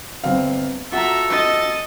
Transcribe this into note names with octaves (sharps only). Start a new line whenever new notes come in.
G1 C4 F5
F4 F#4 A4 E5 F#5 A#5
D#5 A6